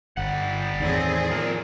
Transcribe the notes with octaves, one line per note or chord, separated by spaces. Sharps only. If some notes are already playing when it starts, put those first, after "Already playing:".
G1 G3 F#5
E2 A2 D#3 C4 G#4 D5
F3 A#4